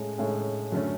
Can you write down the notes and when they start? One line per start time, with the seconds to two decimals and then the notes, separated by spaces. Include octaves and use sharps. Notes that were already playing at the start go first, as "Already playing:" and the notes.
Already playing: A2 G#3 C#4 G#4
0.18 A2 G#3 C#4 G#4
0.72 F#2 D3 A3 C#4